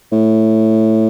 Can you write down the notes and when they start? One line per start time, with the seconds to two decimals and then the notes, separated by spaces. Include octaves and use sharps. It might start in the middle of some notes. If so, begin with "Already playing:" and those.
0.12 A2